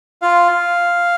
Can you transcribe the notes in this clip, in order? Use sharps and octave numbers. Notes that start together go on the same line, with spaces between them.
F4 F5